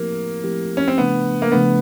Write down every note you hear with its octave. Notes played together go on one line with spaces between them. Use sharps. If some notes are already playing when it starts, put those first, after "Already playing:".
Already playing: F3 A3 A#3 C4 E4 G4
F3 A3 C4 E4 G4
C#4
C4
C#3 F3 A3 B3 D4
A#3
C#3 F3 A3 B3 D4